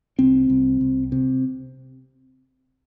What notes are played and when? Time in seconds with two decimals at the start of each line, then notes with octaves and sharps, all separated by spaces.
0.19 C2 C4
0.50 C2
0.81 C2
1.12 C3